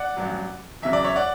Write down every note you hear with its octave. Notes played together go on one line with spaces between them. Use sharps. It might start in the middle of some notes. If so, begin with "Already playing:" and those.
Already playing: D5 F#5
A1 G2 F#3
E2 C#3 F#3 E5
D5
C#5 E5
D5 F#5